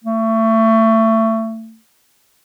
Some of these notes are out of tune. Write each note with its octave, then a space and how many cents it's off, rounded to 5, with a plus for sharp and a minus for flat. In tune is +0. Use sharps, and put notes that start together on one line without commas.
A3 +25